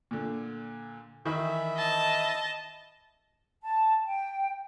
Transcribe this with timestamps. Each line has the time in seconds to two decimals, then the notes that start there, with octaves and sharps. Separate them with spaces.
0.11 A#2 D3
1.26 D#3 E3 E4 E5 B5
1.76 D#5 A5
3.63 A5
4.05 G5